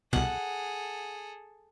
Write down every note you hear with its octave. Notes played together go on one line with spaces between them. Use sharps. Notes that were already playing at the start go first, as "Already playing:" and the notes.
C2 B2 G#4 A4 F#5